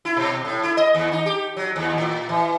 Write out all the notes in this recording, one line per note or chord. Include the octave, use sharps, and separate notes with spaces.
E4
B2
A2
E4
D#5
D#2
D#4
G4
F#3
D#2
A2
E3